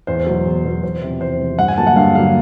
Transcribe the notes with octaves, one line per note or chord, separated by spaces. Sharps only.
E2 C5
B2 F#3
E2
B2 F#3
E2 C5
C3 F3
E2 C5
C3 F3
G2 F#5
G#5
D3 F#3 A#3 A5
F#5
G2 F5
D3 F#3 A#3 F5